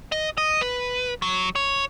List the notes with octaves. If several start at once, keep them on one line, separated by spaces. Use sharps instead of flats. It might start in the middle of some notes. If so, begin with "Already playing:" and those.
D#5
D#5
B4
F#3
C#5